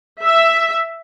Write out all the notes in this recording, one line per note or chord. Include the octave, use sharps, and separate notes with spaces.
E5